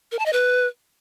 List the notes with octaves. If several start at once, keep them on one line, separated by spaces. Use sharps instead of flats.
A#4
A5
D#5
B4